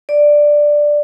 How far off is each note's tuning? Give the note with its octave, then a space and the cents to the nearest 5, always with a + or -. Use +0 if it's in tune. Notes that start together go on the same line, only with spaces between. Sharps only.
D5 +5